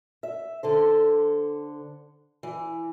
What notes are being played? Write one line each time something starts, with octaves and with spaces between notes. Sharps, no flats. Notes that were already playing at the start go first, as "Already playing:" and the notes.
E5
D3 A4 C5
E3